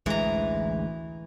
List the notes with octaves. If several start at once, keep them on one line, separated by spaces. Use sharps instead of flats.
A1 D2 E3 G#3 A#5